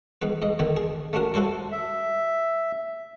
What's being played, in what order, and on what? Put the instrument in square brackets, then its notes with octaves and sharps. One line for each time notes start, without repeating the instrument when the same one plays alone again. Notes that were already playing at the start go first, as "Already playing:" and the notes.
[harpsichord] G#2 B3 B4
G#2 D#5
D3 D#3 B3
G#4
A3 C#4 D4 F#4 A#4
E4 F#4 A4 C5 C#5
[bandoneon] E5